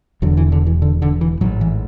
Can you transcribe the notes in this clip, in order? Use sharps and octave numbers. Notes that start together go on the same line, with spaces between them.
E1 E2 D3 F#3
E3
D3
E3
D3
D3
E3
A1 G#2 F#3
E3